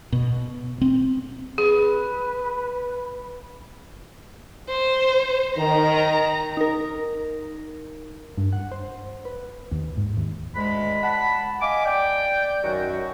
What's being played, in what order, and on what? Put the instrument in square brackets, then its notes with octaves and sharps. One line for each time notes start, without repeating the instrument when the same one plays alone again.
[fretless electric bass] B2
C4
[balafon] G#4 [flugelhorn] B4
[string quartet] C5
[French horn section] D#3 [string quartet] A#5
[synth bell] D#4 A#4
[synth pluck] G2
F#5
C5
B4
D#2
G#2
D#2
[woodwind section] D2 G#3 B5
F#5 A5 B5
D#5 F5 G#5 D6
D5 G5
F#2 D#3 F#3 F#4